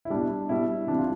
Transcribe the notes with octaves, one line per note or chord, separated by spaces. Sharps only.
E4
B2 G3 D4
B2 G3 E4
C3 E3 G3 D4
F4